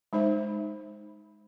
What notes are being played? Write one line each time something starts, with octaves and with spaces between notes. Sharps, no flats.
G#3 D#4 C5 E5